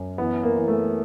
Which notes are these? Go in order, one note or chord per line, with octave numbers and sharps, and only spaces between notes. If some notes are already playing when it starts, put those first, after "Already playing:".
Already playing: F#2
E3 B3
A#3
E3
A3